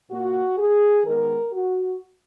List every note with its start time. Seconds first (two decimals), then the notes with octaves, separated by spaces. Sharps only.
0.10 A#2 A#3 F#4
0.58 G#4
1.05 D#3 G#3 B3 A#4
1.53 F#4